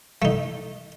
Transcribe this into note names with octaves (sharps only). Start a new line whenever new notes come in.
A3 D#4